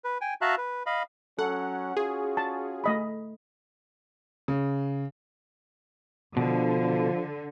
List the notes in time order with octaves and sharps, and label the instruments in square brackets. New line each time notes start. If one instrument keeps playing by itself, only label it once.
[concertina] B4
G5 G#5
F#4 E5 F5 A5 A#5 F#6
B4
D#5 F5 B5
[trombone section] F#3 C#4 [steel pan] A4 [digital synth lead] F#5
[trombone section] C#4 F4 F#4 [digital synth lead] G#4
[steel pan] A5
A3 D#5 B5
[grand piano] C#3
[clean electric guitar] B2 [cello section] D3 [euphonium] F3